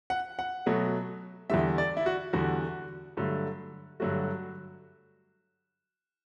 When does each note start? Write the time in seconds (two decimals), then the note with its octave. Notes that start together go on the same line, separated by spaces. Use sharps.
0.10 F#5
0.39 F#5
0.66 B2 F#3 A3
1.50 E2 D3 G3 E5
1.78 D5
1.97 E4
2.06 F#4
2.33 E2 D3 G3 F#4
3.17 G2 D3 F#3 A3
4.00 G2 D3 F#3 A3 F#4